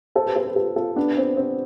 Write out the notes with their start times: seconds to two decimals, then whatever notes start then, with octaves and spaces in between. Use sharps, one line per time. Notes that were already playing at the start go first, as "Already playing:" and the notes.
0.15 A4 C5
0.26 G4 B4
0.36 A4 C5
0.45 G4 B4
0.56 F4 A4
0.76 F4 A4
0.96 B3 D4
1.12 D4
1.17 C4
1.37 C4